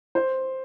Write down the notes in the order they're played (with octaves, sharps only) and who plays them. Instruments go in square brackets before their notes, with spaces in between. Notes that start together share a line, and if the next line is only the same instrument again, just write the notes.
[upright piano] C5